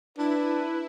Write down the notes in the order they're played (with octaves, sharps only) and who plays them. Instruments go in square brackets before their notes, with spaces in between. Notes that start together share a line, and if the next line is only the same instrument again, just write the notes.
[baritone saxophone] D4 [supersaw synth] E4 [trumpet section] B4